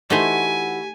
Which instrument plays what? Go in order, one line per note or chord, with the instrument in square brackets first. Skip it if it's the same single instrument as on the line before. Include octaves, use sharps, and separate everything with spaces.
[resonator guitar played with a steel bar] E3 F#4 [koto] A3 D#4 C5 [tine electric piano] G4 B6 [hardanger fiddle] G#5